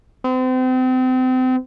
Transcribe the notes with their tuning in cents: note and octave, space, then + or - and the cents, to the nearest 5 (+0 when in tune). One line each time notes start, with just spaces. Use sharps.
C4 -35